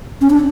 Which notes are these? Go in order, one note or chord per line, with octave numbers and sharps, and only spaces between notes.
C#4
D4